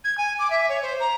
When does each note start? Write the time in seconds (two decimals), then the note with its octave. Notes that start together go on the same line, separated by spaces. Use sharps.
0.04 G#6
0.18 G#5
0.39 D6
0.50 E5
0.69 C#5
0.82 C5
1.00 A#5